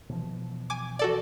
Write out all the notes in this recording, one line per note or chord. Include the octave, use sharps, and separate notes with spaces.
B2 E3 F3
G#5 D6
F#4 A4 D5